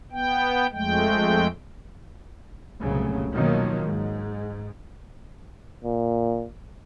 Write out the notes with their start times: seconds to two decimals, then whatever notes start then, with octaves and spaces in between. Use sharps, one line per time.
0.12 B3 G5
0.72 F2 G#3 A3 G5
2.81 F1 C2 A#2 C#3 F#3
3.32 B2 D#3 F3 F#3 A#3
3.83 G#2
5.84 A#2